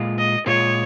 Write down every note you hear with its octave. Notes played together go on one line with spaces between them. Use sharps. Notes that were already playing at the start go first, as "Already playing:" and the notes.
Already playing: A#2 G#3 F4
D#5
A#2 G#3 F4 C#5